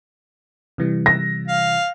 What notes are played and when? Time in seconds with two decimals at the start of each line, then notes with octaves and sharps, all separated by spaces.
0.78 C3 E3 G3
1.06 A#6
1.48 F5